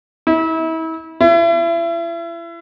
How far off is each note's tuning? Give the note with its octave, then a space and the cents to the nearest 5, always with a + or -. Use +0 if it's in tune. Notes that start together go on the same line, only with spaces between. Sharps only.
E4 -35
E4 +35